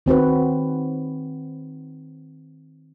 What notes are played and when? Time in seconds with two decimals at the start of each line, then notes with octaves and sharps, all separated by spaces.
0.06 D#3 C4 F#4 B4